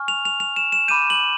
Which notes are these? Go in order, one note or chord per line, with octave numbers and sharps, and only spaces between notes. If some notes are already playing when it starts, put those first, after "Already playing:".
Already playing: G#5 C#6 F6
F7
F7
F7
E7
E7
B5 D6 G6 D#7
F#7